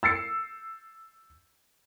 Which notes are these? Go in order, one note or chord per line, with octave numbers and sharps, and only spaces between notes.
E6 A6 C7 C#7